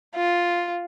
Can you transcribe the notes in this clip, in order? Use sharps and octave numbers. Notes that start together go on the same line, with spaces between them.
F4